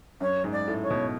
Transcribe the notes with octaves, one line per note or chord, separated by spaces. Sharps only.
F#2 C#5
G#2
D5
A2
C#5
B2